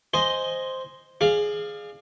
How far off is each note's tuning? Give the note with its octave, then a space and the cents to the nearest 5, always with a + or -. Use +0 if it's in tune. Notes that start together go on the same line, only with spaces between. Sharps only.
C5 +0 D#5 +0 G#5 +0
G#4 +5 D5 +35 F5 +0